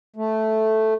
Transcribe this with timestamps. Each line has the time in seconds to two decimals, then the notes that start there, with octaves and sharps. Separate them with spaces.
0.16 A3